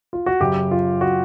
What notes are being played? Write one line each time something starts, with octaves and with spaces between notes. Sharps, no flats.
F4
F#4
F#2 C#3 F#3 G4
F4
F#4